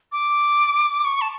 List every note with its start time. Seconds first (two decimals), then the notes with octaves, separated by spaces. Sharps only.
0.12 D6
1.05 C#6
1.21 A5